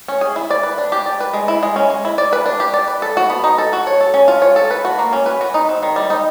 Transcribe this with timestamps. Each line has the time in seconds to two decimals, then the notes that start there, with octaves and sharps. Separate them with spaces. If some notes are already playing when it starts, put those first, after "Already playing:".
0.08 C#4
0.21 G#4
0.36 E4
0.50 D5
0.63 B4
0.78 D4
0.92 G4
1.06 D5
1.20 B4
1.34 G#3
1.48 E4
1.63 G#3
1.76 C#4
1.90 G#3
2.05 E4
2.18 D5
2.33 B4
2.46 D4
2.60 G4
2.74 D5
2.88 B4
3.02 A4
3.17 F#4
3.30 B3
3.44 D#4
3.58 A4
3.73 F#4
3.87 C#5
4.01 A4
4.14 C#4
4.28 F4
4.42 C#5
4.56 A4
4.71 B4
4.85 F#4
4.99 A#3
5.13 C#4
5.26 B4
5.41 F#4
5.54 D#4
5.69 C4
5.83 D#3
5.96 G3
6.10 D#4